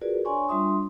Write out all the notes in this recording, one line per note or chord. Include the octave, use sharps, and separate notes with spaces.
F4 F#4 G#4 A#4 B4 D5
D4 C#5 D5 G#5 C6 C#6
G3 D4 F4 E5 C6 D#6